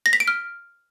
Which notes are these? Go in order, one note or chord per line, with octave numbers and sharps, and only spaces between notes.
A#6
B6
D7
F6